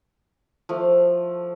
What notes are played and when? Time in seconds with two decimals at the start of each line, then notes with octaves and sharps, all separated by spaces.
0.69 F3 A3